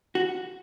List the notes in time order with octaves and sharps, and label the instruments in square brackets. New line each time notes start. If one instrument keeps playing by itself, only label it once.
[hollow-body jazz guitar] F#4